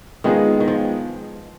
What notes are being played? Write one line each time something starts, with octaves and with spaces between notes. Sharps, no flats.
D#3 G#3 B3 F4 G#4
D#3
F3